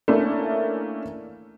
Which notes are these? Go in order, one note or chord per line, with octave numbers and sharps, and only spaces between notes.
A3 A#3 C#4 D4 E4